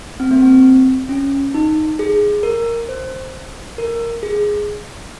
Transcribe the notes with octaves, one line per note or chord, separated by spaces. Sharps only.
C4
A#3
C4
C#4
D#4
G#4
A#4
C5
A#4
G#4